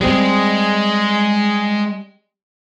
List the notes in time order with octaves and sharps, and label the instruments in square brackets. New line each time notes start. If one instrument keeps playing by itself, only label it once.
[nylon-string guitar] G3 C4 [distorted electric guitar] G#3 G#4